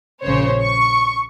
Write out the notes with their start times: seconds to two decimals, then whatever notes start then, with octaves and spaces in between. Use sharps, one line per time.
0.23 A#1 C#3 C5 C#5
0.61 C#6